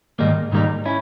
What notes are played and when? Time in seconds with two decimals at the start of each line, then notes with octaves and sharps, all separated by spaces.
0.19 G#2 D#3 G3 A#3 D#4
0.52 G#2 D#3 G3 A#3 D#4
0.85 C#4 E4